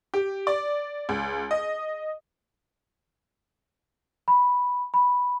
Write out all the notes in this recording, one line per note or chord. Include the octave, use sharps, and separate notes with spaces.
G4
D5
C#2
D#5
B5
B5